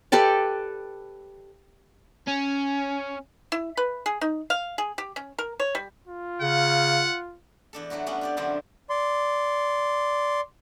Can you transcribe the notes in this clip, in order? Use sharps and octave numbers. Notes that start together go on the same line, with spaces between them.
G4 A4 B4 D5
C#4
E4
B4
G#4
D#4
F5
G#4
G4
C#4
A#4
C#5
G3
F4
C#3 F#5
E2 D4 A4
F#3 A3 D4 E4 F#4
G3 B3 C#4 D4 F#4
D4 G4 D5
F#2 D3 F3 C4 E4 D5
D5 C6